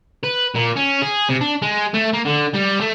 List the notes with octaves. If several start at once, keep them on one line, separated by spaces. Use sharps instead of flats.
B4
A#2
C#4
G#4
C3
D4
G#3
A3
A#3
D3
G3
A3